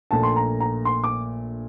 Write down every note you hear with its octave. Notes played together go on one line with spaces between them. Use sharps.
A#1 A#2 A3 A5
C6
A#5
A#5
C6
D6